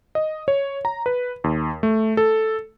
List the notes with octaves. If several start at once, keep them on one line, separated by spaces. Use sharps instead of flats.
D#5
C#5
A#5
B4
D#2
A3
A4